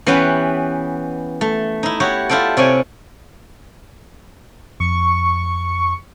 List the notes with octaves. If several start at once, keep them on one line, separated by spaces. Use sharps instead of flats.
E3 B3 C#4 G4 B4 F#5
A3
D#4 E4
E4 F#4 G4 C#5
E4 F4 G4 A4 D5
C3 C#5 D5 G#5
F2 C#6